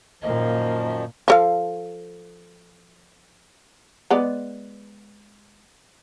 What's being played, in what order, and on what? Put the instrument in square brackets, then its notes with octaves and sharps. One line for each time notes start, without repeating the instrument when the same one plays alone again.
[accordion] F#2 D#3 F3 [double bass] A#2 A#3 [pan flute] D#5
[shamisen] F3 A4 F5
G#3 B3 D5